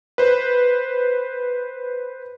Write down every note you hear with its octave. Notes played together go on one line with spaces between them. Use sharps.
B4 C5